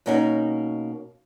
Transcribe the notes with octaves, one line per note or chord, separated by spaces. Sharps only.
B2 A#3 C#4 D#4 F#4 A#4